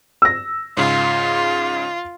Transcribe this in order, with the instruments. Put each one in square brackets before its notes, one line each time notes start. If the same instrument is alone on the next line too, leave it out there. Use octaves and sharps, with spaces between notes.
[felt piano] E6 A#6
[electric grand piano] G#2 C#3 [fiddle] F4